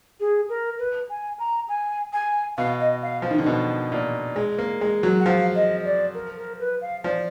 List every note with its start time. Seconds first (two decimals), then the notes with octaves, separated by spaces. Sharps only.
0.20 G#4
0.49 A#4
0.79 B4
1.09 G#5
1.39 A#5
1.69 G#5
2.13 G#5
2.57 B2 F5
2.80 D#5
3.02 F5
3.22 F3
3.31 D#3
3.38 D3
3.46 B2
3.92 A#2
4.36 G#3
4.58 A#3
4.81 G#3
5.03 F#3
5.20 F#5
5.25 F3 F5
5.55 D#5
5.85 D5
6.14 A#4
6.37 A#4
6.60 B4
6.81 F5
7.04 F3 D5